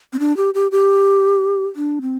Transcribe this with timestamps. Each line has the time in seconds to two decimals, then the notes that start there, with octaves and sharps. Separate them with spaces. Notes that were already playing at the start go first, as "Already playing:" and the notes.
0.13 C4
0.19 D4
0.37 G4
0.54 G4
0.72 G4
1.76 D4
2.01 C4